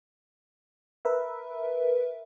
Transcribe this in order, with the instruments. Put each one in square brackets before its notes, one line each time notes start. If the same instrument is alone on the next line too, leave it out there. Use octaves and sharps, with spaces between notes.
[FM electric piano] A#4 B4 E5